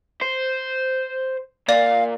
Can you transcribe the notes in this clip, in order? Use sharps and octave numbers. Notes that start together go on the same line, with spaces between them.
C5
A#2 D5 F5